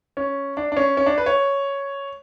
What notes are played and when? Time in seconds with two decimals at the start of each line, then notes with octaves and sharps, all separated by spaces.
0.17 C#4
0.57 D4
0.72 D4
0.77 C#4
0.97 C#4
1.06 D4
1.18 B4
1.26 C#5